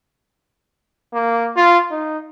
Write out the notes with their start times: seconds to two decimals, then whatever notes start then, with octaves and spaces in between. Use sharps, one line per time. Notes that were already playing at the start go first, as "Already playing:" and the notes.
1.14 A#3
1.57 F4
1.91 D#4